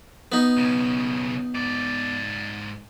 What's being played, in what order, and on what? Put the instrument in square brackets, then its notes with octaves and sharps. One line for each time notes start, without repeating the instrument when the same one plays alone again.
[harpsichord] B3 D#4
[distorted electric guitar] B1 C#3
G#2 D5